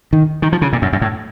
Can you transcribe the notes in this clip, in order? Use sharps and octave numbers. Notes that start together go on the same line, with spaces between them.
D#3
D#3
F3
C#3
A#2
F#2
F#2
A2